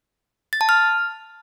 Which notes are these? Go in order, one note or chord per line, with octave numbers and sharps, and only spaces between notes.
A6
A5
F6